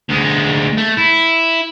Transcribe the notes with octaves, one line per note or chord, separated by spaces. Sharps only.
D2 G#3
A3
E4